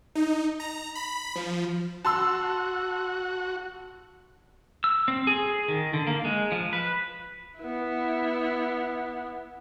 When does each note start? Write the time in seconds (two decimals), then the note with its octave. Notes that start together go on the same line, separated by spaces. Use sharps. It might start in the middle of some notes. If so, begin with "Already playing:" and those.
0.15 D#4
0.60 A#5
0.95 B5
1.35 F3
2.05 F#4 A5 C6 E6
4.84 E6
5.08 C4
5.27 G#4
5.46 G#4
5.68 D#3
5.93 D3
6.07 A#3
6.25 G#3
6.52 F3
6.73 B4
7.58 B3 E4